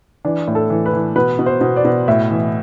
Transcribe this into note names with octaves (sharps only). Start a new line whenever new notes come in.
E3 D4
A2
A4
E3
B4
E3
B2 B4
B2
C5
B2
D5
B2
A2 E5
E3